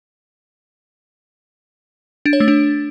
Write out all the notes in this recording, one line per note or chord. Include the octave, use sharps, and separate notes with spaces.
D4
C#5
A3
D4